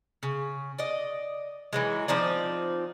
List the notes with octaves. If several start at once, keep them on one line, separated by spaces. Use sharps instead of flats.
C#3
D5 D#5
E3 F#3 G#3
F3 C4 D#4 D5